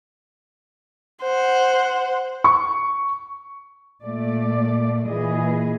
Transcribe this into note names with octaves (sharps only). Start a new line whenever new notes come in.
C5 F#5
C#6
A#2 A3 D5
A#2 E3 G#4 D#5